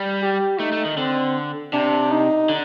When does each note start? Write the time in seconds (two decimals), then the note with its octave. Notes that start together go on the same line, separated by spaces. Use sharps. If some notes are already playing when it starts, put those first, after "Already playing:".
Already playing: G3
0.22 G4
0.60 A3 D#4
0.72 A3
0.85 D#3
0.97 D3 C4
1.73 C3 D4
2.11 D#4
2.49 D3